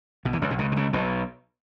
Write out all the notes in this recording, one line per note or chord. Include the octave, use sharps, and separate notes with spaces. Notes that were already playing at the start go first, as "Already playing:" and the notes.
B1 B2
E2 E3
C#2 C#3
B1 B2
C#2 C#3
B2
C#2 C#3
B1 B2